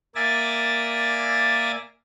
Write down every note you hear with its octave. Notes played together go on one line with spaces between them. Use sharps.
A#3 D5 E5 G#5 A6 A#6